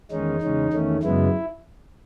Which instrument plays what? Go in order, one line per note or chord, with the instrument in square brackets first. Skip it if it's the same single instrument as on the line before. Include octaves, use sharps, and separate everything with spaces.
[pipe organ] E2 D#3 G#3 C#4 D#4
E2 C#3 G#3 C#4
E2 D#3 A3 C#4
F#2 C#3 G#3 B3 E4